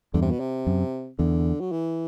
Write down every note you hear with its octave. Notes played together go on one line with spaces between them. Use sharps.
E2 G2 D3
C3
B2
C3
F#2
E2 D3
F#3
E3